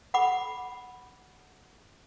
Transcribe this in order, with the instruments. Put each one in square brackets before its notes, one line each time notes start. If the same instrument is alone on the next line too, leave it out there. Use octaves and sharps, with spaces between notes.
[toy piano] F#5 B5 D6